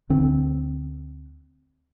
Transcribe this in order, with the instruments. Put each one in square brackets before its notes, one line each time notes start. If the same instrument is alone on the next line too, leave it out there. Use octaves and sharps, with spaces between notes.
[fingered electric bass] D2 D3 C4